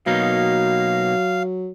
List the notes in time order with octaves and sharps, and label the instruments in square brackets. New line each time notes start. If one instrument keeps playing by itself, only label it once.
[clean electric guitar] B2 A#3 D#4 [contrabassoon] F#3 [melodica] F5